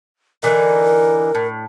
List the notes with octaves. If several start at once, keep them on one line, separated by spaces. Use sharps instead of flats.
D3 E3 D#4 A#4
A2